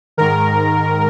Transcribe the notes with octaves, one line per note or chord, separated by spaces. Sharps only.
G#2 D#3 A#4